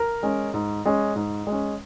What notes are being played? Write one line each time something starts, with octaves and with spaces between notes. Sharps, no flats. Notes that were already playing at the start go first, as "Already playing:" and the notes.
Already playing: A#4
G#3 C#4
G#2
G#3 C#4
G#2
G#3
C#4